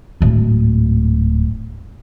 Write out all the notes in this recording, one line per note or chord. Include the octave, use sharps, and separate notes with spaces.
D1 G#2